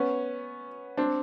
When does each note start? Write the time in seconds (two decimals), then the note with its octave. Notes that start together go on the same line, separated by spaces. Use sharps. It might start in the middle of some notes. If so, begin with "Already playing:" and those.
Already playing: B3 C#4
0.97 C4 D4